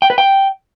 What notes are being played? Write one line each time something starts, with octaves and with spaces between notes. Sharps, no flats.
G5
B4
G5